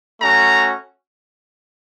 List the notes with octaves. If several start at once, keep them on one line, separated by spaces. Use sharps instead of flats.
A3 C#4 F#4 A#5